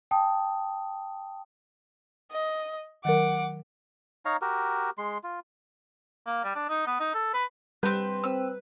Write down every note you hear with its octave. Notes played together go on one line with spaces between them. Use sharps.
G5 A5 D#6
D#5
D#3 F#3 A#4 F#5 D6
D#4 C#5 F5 A#5
F#4 G4 A#4
G#3 C6
F4
A#3
G3
D4
D#4
B3
D#4
A4
B4
G3 C4 B4 G6
C4 E6